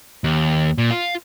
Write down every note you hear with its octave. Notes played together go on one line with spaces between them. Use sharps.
D#2
A#2
F4